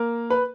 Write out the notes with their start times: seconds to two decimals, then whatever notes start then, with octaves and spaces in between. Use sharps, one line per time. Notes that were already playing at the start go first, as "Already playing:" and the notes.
Already playing: A#3 A#4
0.30 B4